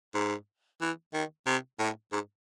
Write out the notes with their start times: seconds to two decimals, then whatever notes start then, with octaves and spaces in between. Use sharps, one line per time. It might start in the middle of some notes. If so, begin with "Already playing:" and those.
0.14 G#2
0.81 E3
1.13 D#3
1.46 C3
1.79 A2
2.12 G#2